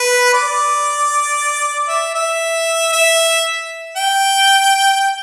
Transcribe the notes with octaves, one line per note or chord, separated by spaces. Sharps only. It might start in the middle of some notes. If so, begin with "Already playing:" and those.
Already playing: B4
D5
E5
E5
E5
G5
G5